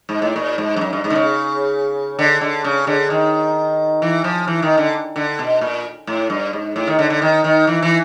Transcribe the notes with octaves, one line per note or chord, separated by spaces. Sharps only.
G#2
A2
A#2
G#2
G2
F#2
G2
G#2
D3
C#3
D3
D3
C#3
D3
D#3
E3
F3
E3
D#3
D3
D3
B2
A#2
A2
G2
G#2
A2
D#3
D3
D3
D#3
D#3
E3
E3